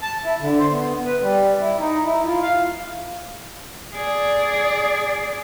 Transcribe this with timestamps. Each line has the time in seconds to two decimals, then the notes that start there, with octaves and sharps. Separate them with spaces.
0.01 A5
0.24 E4
0.41 D3
0.59 C5
0.70 B3
1.05 B4
1.21 G3
1.59 E4
1.79 D#4
2.04 E4
2.26 F4
2.42 F5
3.95 G#4 D5